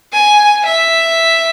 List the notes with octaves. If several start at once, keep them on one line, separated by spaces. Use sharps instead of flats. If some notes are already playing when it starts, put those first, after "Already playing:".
G#5
E5